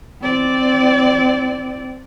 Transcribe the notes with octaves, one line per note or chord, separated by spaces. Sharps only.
C4 D5